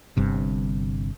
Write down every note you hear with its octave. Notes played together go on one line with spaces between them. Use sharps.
G1 G2 C3